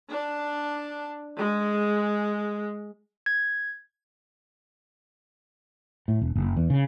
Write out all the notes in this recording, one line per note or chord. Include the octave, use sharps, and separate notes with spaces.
D4
G#3
G#6
A2
E1
F#1
E2
C#3